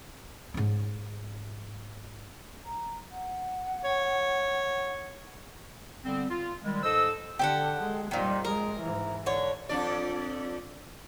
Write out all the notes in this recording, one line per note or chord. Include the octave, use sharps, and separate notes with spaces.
G#2 C#4
A#5
F#5
C#5
D3 G3 B3 C4
F4
D#3 G3 G#3
G#2 A4 C5 D#5 E6
D3 G4 A4 F#5
G#3
F2 A#2 D#3 G3
G#3 A#4
G#2 E3
D3 C#5
F2 D4 D5